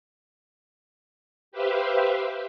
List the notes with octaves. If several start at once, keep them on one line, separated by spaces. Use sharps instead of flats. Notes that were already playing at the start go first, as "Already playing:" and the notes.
G4 B4 C5 E5 F5